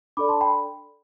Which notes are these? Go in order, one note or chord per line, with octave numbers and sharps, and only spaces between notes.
D4 A4 D5 B5 D6
A5 C6
G5 B5